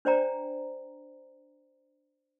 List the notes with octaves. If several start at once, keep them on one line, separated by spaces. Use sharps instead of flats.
D4 C5 D5 G5 A#5